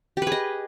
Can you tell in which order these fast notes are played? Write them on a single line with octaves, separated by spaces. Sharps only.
G4 B4 G#4 D#5